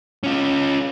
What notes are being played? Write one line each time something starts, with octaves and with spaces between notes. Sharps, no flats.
C#4 F4